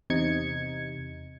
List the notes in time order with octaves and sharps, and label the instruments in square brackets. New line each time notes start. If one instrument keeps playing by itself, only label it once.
[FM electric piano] E2 C3 D#4 G#6 C#7